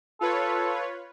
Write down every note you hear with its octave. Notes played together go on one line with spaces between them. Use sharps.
F4 A4 B4 C#5